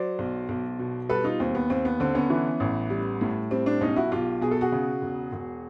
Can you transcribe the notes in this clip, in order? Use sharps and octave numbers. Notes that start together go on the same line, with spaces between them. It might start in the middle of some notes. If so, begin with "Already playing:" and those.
Already playing: F#3 C5 D5
B1
B1
B2
G3 A4 B4
D#4 F4
D#2 C4
B3
D#2 C4
B3
D3 C4
B3 C#4
E3
A1
G3
A2
G3 C4
C4 D4
B1 C#4 D#4
E4 F#4
B1 F4 G4
B2 G#4
A4
F#4 G#4
C#3
E1
E1